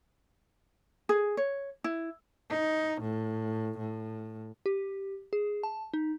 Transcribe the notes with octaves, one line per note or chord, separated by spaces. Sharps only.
G#4
C#5
E4
D#4
A2
A2
G4
G#4
A5
D#4